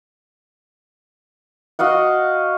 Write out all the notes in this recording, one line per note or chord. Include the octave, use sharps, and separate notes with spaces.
F#4 D#5 F5 F#5